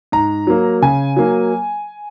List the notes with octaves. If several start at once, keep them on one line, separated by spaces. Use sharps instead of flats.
G#2 A#5
F#3 A#3
C#3 G#5
F#3 A#3